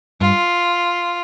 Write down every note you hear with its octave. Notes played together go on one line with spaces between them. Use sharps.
G2 F4